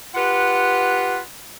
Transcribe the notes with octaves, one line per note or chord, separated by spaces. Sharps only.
F4 G4 B4 F#5